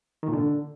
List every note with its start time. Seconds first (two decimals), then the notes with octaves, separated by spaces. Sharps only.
0.23 D#3
0.28 A#2
0.33 D3